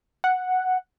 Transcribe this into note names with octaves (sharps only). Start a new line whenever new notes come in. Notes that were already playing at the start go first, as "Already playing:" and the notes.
F#5